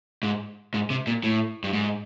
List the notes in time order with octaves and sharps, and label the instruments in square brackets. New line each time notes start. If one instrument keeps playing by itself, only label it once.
[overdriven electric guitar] G#2
G#2
C3
A#2
A2
G2
G#2